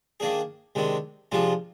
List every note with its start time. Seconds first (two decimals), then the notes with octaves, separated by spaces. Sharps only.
0.20 D#3 A#3 D4 G#4
0.75 C3 D#3 G#3 D4
1.32 C3 F3 G#3 D4 F4